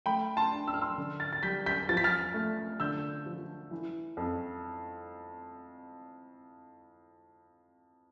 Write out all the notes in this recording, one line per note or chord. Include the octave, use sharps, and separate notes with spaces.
A3 G5 B5
A5 C6
D4
E6
F6
C6 E6
D3
F6 A6
A6
G3 G6 B6
G6 B6
F3 A6
B6
F6 A6
A3
D3 E6 G6
F3
E3
F2